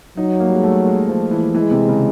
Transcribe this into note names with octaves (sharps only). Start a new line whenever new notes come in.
F#3 D#4
A#3
G3
G#3
A3
G#3
F3
E3
E3 G#3
C3
C#3